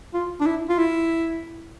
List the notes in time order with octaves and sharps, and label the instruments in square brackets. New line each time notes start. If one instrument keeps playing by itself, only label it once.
[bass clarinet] F4
D4
E4
F4
E4